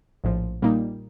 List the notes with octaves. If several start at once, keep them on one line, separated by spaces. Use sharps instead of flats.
A#1 A2 F3
A#2 G3 A#3 D#4